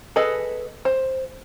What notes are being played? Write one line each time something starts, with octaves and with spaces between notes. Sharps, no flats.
G#4 A4 B4 D#5
C5